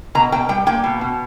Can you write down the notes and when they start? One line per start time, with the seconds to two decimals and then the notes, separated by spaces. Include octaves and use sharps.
0.15 B2 A#5
0.32 B2 G5
0.49 G3 G5
0.66 A#3 G5
0.84 B2
1.01 B2